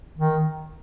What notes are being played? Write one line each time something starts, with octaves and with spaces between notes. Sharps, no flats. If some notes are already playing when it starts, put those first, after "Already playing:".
D#3